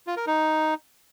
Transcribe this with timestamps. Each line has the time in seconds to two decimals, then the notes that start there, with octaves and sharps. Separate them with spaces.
0.07 F4
0.17 A#4
0.27 D#4